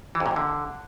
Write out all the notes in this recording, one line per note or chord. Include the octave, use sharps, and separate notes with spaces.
E3
F2
A#2
F2
D3